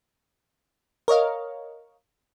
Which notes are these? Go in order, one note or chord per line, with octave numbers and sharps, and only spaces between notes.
A#4 C#5 D#5 F5